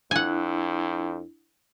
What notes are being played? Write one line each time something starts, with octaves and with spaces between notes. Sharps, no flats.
F2 D4 E4 F#5 G#5